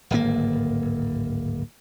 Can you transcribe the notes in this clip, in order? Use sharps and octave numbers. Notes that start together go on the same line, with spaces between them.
D1 G#1 A#3